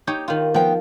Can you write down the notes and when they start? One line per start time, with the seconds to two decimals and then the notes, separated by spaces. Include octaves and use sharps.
0.07 D#4 G4 C#5
0.28 D#3 F4
0.54 F3 B3 G5